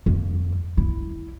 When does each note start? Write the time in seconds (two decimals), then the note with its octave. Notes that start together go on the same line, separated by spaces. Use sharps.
0.06 F2
0.77 E4